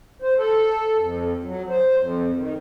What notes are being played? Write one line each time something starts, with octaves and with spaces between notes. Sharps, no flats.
C5
A4
F2
F#3
C5
F2
D#3